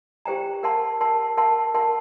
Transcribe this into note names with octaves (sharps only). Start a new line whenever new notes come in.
G4 C5 G5 A#5
A#4 F#5 A5 C6
A#4 F#5 A5 C6
A#4 F#5 A5 C6
A#4 F#5 A5 C6